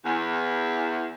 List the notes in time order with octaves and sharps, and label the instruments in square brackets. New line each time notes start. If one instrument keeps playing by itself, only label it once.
[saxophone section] E2